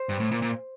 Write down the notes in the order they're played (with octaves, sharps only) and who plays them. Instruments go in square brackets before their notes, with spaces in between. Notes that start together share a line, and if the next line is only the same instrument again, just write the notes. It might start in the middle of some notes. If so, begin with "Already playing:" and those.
Already playing: [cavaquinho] C5
[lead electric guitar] G2
A2
A#2
A#2